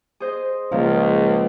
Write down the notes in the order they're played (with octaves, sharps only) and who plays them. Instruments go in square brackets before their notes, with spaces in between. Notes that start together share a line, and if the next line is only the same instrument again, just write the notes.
[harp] G#4 C5 D#5
[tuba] C#2 [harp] A#2 F3